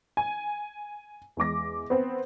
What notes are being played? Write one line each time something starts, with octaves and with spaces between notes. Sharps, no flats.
G#5
E2 G#3 D6 A#6
B3 C4